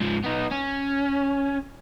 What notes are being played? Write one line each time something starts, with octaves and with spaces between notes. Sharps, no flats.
G#2 F3
B3 D#4
C#4